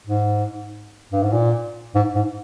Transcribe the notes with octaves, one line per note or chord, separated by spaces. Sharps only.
G#2
G2
G#2
A#2
G#2
G#2